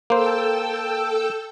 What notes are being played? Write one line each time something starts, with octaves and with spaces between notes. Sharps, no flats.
A#3 A4 C5 G5 E6